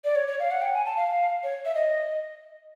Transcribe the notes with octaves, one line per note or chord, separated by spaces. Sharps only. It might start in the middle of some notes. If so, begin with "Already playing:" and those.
D5
C#5
C#5
F5
F#5
G5
G#5
A5
F5
C#5
E5
D#5